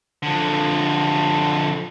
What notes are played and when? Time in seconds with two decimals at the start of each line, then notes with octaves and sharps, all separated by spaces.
0.23 D3 F3